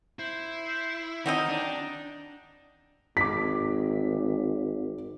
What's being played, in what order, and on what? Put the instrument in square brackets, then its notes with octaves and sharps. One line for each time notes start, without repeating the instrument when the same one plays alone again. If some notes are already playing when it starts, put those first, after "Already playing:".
[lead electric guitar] E4 [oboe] C5
[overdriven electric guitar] D#3 [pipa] F#3 C4 D#5 [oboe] D#4
[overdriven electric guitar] D4
[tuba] G#1 [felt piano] D6 B6